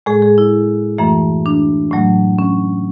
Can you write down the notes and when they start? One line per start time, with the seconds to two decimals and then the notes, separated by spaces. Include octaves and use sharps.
0.06 A2 G#3 G#4
0.22 G#4
0.38 E4
0.98 F#2 E3 A3
1.46 D4
1.91 A2 F#3 A3
2.39 C#4